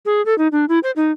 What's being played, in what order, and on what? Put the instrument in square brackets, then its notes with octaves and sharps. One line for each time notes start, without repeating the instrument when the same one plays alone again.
[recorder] G#4
A4
D#4
D4
E4
C5
D#4